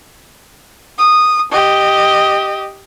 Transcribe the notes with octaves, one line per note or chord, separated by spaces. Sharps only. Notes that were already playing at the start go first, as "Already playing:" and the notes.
D#6
G4 D#5